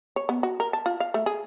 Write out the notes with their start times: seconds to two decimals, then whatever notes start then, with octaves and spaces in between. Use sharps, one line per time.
0.16 C#5
0.29 B3
0.43 F#4
0.60 A#4
0.73 A5
0.86 F4
1.00 F5
1.14 A3
1.26 G#4